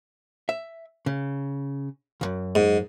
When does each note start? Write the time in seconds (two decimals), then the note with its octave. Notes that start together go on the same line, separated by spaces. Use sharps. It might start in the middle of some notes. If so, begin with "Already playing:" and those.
0.49 E5
1.06 C#3
2.21 C#2 F#2
2.55 G#2